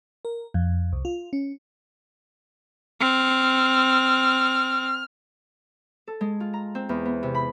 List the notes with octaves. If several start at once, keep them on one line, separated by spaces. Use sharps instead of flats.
A#4
F2
C2
F4
C#4
C4 F6
A4
G#3
F4
A#5
C4
E2
B3
C3
B5